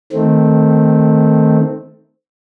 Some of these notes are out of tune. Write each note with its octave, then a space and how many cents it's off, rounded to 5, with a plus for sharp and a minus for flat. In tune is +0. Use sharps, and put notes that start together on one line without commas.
D#3 +0 A3 +0 C4 +0